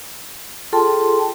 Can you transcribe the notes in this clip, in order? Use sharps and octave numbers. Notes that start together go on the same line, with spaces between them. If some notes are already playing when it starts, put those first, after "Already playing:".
F4 G#4 A4 G5 A5 C6